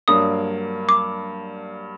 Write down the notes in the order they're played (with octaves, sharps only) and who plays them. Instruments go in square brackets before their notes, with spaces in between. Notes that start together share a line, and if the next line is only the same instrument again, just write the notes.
[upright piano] G2 F#3 A#3 D4 [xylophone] D#6
[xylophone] D6